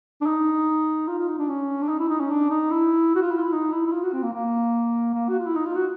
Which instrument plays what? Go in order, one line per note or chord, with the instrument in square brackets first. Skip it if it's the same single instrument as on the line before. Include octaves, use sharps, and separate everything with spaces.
[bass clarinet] D4
D#4
F4
F4
D#4
D4
C#4
D4
D#4
E4
D#4
C#4
D4
D#4
E4
F#4
F4
E4
F4
E4
D#4
E4
E4
F4
F#4
C4
A#3
A#3
A#3
F#4
F4
E4
D#4
F4
F#4